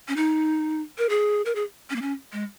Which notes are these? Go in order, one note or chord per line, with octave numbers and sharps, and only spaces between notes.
C#4
D#4
A#4
G#4
A#4
G#4
C#4
A#3
C#4
G#3